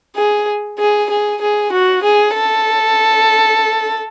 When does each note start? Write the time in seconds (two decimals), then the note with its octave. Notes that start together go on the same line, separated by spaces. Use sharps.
0.16 G#4
0.79 G#4
1.10 G#4
1.41 G#4
1.72 F#4
2.03 G#4
2.35 A4